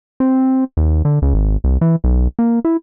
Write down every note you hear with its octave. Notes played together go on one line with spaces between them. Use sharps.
C4
D#2
D3
C#2
G#1
C2
E3
B1
A#3
E4